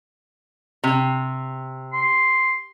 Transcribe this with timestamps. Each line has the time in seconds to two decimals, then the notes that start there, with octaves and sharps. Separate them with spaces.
0.84 C3
1.93 C6